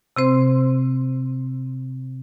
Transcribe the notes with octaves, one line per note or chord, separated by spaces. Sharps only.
C3 C4 C5 C6